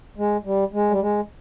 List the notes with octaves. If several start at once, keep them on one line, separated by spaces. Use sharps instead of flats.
G#3
G3
G#3
G3
G#3